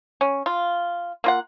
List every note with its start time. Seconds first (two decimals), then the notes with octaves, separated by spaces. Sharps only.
0.21 C#4
0.46 F4
1.24 A#3 F4 F#5